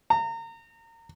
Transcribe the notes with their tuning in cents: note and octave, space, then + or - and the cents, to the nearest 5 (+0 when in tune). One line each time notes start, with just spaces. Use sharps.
A#5 -30